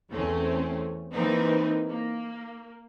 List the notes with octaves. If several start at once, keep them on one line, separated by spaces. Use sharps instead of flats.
E2 A3 C4 C#4
E3 A#3 C4 D#4 A#4 B4
A#3